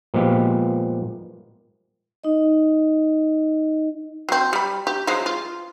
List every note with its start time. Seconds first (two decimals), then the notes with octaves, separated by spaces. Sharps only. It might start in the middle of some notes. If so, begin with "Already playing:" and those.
0.14 A#2 F3 G#3 B3 G4
2.24 D#4 D#5
4.29 F#3 C4
4.53 G3 B5
4.87 G4
5.07 F3 F#3 G#3
5.26 F4